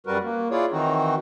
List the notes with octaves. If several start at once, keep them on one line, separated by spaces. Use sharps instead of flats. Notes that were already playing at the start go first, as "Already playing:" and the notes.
F#2 G3 F#4 A#4 B4
A#3
E4 F4 G#4 C#5 D5
D#3 E3 C4 D#4 F#4